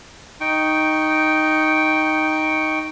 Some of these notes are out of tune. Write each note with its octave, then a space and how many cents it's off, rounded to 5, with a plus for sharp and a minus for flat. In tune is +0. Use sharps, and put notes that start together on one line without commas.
D#4 +0 G5 +0 C#6 +0